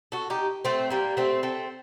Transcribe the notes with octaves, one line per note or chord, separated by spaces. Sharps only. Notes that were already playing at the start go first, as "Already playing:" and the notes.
F#4 A4
D#4 G4
A3 C4
G3 A#3
A3 C4
A3 C4